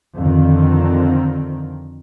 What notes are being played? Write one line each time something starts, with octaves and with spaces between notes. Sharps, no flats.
F2 D3 D#3 C4